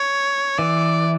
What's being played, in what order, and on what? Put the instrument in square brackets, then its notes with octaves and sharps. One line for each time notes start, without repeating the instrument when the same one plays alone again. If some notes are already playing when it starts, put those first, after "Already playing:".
Already playing: [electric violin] C#5
[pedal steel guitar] E3 [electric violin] D5